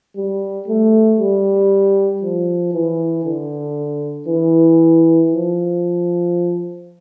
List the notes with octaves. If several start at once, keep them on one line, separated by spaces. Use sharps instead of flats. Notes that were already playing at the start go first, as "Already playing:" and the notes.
G3
A3
G3
F3
E3
D3
E3
F3